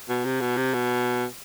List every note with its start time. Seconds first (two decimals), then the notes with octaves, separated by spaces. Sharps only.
0.09 B2
0.25 C3
0.41 B2
0.57 C3
0.74 B2